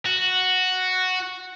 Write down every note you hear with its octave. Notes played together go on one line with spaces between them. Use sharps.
F#4